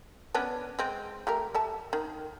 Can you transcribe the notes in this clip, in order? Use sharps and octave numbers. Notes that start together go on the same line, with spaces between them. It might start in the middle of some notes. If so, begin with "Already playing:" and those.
B3 C#4 D4
G#3 C4
A3 G4 A#4
A4 E5 A5
D#3